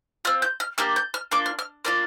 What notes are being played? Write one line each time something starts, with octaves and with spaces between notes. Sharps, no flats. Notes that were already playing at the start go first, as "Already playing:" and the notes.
C4 F4 F6
G6
F6
A#3 D4 G4 F6
G6
F6
A#3 D4 F4 D6
F6
F6
A#3 D4 F4 F6